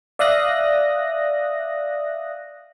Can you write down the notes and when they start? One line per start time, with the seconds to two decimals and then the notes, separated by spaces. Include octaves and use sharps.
0.19 D5 E5 F5 D#6 F#6 A#6